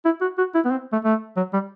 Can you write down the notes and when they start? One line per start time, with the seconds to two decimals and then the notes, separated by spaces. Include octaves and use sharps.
0.05 E4
0.21 F#4
0.38 F#4
0.55 E4
0.65 B3
0.71 C4
0.93 A3
1.04 A3
1.37 F#3
1.53 G3